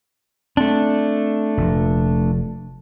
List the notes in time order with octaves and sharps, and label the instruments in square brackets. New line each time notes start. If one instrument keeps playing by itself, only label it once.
[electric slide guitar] A3 D4 [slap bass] C4
[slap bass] F1 A#2 F3